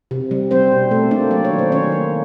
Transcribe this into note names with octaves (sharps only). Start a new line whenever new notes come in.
C3
G3
G3 C4 C5
B2
B2 A3 A4
A#3 D4 D5
F#3 D5
C#5
D#3
C5
D#3 C#4 C#5
A#3